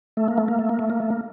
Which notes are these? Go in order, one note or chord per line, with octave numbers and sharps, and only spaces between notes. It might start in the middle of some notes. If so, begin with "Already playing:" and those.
A3
A#3
A3
A#3
A3
A#3
A3
A#3
A3
A#3